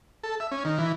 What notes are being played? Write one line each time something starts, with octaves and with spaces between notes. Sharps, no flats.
A4
E5
C#4
D#3
E3